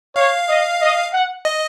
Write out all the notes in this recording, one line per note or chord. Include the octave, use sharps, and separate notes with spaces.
C#5 F5
D#5
D#5
F#5
D#5